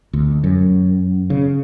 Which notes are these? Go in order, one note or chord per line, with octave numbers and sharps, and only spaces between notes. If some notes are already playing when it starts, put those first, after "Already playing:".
D2
F#2
C#3